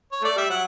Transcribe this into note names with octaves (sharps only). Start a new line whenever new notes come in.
C#5
A3 D5
G3 E5
F#3 F#5